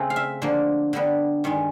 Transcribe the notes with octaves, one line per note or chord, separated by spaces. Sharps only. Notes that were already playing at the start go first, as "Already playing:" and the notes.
Already playing: C#3 A3 C4
F5
E5
D3 F3 A#3
D3 G3 B3
G2 D#3 G#3